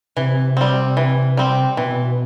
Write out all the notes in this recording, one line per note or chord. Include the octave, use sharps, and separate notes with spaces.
C3 E3
G3 C4
E3
G3 C4
B2 E3